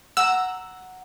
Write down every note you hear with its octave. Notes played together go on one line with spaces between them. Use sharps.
F#5 A#5 E6